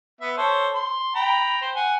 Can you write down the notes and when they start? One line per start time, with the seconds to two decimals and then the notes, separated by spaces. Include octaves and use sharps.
0.21 B3 E5
0.37 A4 C5 C#5
0.75 C6
1.15 G5 A#5 B5
1.61 C5
1.76 F#5 G#5